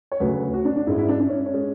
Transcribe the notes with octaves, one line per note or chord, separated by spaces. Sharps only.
C#5
D2 C#3 F#3 A3 B4
F#4
D4
D4
G#2 G#3 E4
E4
D4
D4
C#4
C#4
G#3